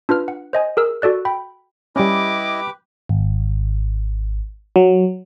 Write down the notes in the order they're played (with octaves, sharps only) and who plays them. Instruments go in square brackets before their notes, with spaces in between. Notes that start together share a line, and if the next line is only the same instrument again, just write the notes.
[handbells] D4 F4 B4 F6
F#5
C5 D#5 G#5
G#4 A#4 E6
F#4 A4 D5 F#6
G5 B5
[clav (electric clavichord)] G3 C#4 [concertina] E4 D#5 [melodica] G4 B4 [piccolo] D6
[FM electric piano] G#1
F#3